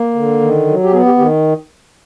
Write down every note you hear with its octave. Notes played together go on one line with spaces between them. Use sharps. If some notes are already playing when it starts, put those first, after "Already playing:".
Already playing: A#3
D3
D#3
F#3
G4
B3 G#4
G4
D#3 G4